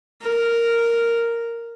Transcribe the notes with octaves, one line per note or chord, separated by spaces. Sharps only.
A#4